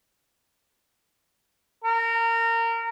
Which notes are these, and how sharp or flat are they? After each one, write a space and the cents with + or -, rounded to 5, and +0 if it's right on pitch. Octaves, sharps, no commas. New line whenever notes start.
A#4 -25